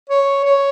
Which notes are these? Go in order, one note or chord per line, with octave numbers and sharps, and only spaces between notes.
C#5
C#5